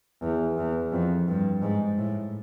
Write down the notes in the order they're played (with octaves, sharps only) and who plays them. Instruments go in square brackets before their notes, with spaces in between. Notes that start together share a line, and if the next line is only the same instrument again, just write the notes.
[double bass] E2
E2
F2
G2
G#2
A2